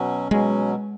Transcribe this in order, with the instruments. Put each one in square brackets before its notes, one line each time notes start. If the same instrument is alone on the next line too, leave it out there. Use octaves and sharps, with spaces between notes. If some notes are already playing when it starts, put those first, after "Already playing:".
Already playing: [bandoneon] B2 F#3 C#4
[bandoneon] B2 F#3 C#4 [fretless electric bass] G#3